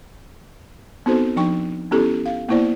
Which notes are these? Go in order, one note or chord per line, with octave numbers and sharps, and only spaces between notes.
B3 C4 D#4 F#4 A4 C5
F3 D4 D#4 G5 C#6
B3 C#4 E4 G4 A4
F5
A#3 B3 E4 C5 D5